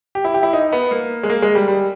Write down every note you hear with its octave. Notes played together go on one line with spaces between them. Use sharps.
G4
E4
G4
E4
D#4
B3
A#3
G#3
A#3
G#3
G3
G3